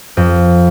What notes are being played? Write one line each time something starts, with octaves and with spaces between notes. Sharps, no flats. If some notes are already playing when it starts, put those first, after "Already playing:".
F2